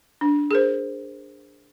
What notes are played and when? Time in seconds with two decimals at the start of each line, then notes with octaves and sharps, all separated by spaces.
0.21 D4
0.51 G#4 A#4 C5